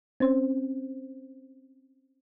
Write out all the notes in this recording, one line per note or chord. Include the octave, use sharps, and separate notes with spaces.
C4 C#4 C5